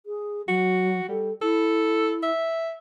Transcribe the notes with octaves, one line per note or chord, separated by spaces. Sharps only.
G#4
F#3 F#4
G3 A4
E4 A4
E5